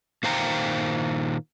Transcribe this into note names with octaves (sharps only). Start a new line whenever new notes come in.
A#2 D#3 C5 F5 G5 A#5